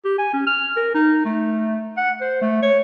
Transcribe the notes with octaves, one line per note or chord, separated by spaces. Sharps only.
G4
G#5
C#4
F6
A#4
D#4
A3
F#5
C5
A3
C#5